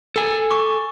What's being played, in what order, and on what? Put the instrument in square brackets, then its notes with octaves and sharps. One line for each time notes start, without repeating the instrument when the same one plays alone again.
[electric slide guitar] A4 G#5
[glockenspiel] C#6 D6